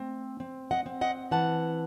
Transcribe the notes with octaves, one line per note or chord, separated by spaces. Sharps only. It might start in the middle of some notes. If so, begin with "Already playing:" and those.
Already playing: A3 C4
C4
D#5 F#5
C4
D#5 F#5
E3 F#5 A5